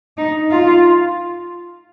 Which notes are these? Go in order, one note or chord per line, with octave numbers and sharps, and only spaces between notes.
D#4
F4